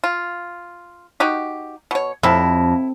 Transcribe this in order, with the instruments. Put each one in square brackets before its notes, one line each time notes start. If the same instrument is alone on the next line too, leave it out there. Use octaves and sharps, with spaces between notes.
[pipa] F4
D#4 F#4 G4
B2 C#5
[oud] F2 [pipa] C3 E4